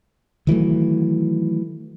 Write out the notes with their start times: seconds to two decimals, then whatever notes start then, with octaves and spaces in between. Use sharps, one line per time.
0.47 D#3 E3 F#3 A3